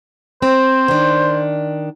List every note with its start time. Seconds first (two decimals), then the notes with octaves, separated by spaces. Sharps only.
0.42 C4 C5
0.88 D#3 D4